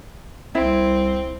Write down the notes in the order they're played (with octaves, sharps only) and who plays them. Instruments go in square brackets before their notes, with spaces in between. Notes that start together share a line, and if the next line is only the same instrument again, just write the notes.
[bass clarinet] C2 [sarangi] C4 [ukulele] E4